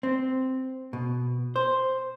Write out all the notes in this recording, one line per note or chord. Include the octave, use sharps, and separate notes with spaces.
C4
B2
C5